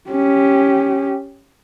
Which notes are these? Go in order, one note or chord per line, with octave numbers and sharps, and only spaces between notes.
C#4 G4